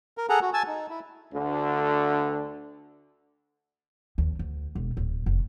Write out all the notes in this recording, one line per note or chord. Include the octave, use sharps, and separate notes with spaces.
A#4
G#4 A4 F#5 A#5
F#4
G#5 A5 E6
D#4
E4
D2 D3
D#2
D2
E1
D1
F1